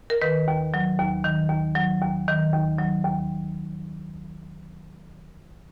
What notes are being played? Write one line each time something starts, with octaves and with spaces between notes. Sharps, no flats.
A#4
D#3 B4
D#2
F#3
D#2
D#3
D#2
F#3
D#2
D#3
D#2
F#3
D#2